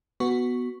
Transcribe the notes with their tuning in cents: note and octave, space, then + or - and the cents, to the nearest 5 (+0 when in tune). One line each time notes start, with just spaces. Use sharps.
B3 +0 F#4 +0 C#6 +0